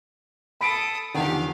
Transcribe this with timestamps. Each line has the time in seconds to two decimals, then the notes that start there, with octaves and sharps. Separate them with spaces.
0.61 A4 B5 D#6 B6 D7
1.15 E2 D3 D#3 F3 G4 F5